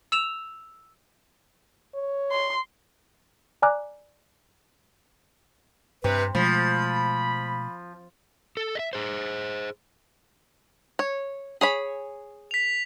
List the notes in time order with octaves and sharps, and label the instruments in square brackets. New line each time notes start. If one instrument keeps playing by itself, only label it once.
[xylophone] E6 E7 F7
[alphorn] C#5
[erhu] C6
[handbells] D5 G#5 A#5 D6 F6 F#6
[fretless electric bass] G2 [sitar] C3 [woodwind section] B4
[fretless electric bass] B2 G#3 A3 [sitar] F3 [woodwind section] B5
[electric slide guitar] A4
D#5 E5
G#4 C5
[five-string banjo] C#5
G#4 C#5 B5
[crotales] B6 F7